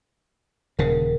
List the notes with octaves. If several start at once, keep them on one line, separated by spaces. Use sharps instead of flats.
D#1 C#3 A#4